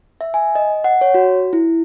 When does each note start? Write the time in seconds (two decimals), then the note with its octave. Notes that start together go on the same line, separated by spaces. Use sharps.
0.21 E5
0.34 G#5
0.55 D#5
0.84 F#5
1.01 C#5
1.14 F#4
1.53 E4